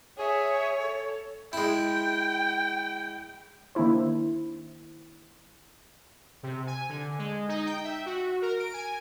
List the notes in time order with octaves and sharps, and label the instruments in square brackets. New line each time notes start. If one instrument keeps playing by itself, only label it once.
[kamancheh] G#4 E5 [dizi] C#5
[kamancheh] A4
[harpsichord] G#3 E4 [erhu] G5
[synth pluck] D#3 A#3 D4 E4 C5
[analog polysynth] C3
G#5
D3
G#3
D#4
G5
E5
F#4
A#4
D7
G#5